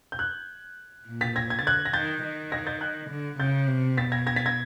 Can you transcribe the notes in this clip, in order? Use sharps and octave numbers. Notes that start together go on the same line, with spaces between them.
G6
F#6 G#6
A#2
A6 B6
G#6 A#6
G#6
A6
D3 F#6 G#6
A#6
D#3 G6 A6
D#3
G#6 A#6
G6 A6
F#6 G#6
D3
C#3 G6 A6
C3
B2 A6 B6
G#6 A#6
G#6 A#6
A6 B6
G#6 A#6